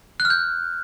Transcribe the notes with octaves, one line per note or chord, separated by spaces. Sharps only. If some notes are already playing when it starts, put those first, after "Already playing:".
F#6
F6
G6